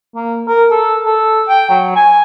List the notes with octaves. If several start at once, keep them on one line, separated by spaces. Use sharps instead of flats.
A#3
A#4
A4
A4
G5
F#3
G#5